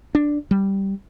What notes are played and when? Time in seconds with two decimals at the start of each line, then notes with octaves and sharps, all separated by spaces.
0.15 D4
0.51 G3